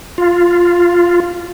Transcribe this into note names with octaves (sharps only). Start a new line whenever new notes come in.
F4